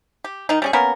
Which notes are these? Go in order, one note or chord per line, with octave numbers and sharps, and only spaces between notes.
G4
D#3 D#4
G3 C#4 G#4
A#3 B3 C#4 A#4